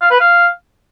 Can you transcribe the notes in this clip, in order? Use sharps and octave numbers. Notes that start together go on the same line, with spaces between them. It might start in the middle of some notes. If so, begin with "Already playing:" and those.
F5
B4
F5